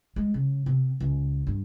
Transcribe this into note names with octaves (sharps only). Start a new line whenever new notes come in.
G#3
C#3
C3
C#2
G2